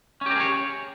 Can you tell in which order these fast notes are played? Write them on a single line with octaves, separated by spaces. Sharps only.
C#4 G4 A#4 G#4 C#5